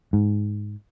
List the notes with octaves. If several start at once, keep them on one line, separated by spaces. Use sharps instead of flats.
G#2